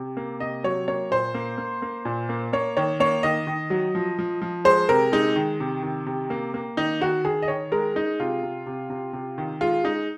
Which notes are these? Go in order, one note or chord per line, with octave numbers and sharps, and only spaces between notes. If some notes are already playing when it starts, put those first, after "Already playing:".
Already playing: C3
A#3
C3 D#5
F#3 C#5
A#3 C#5
A#2 C5
A#3
A#3
A#3
A#2
A#3
A#3 C#5
D#3 C#5
A#3 C#5
D#3 D#5
D#3
F#3
F3
F3
F3
G#3 C5
C3 A#4
G#3 D#4
D#3
C3
D#3
C3
A#3
A#3
D#3 D#4
D#3 F#4
D#3 G#4
D#5
D#3 C#5
G#3 A#4
G#3 D#4
C3 F4
C3
C3
C3
C3
D#3
G#3 F4
G#3 D#4